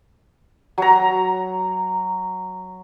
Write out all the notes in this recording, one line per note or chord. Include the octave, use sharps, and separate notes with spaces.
F#3 A#5